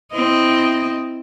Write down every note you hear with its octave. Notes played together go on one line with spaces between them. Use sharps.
C4 E4 D#5